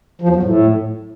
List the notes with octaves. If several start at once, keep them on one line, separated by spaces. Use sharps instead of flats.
F3
E2
F#3
A2